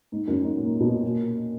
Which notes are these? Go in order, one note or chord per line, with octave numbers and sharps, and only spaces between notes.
G#2
F#2
G#2
A#2
B2
A#2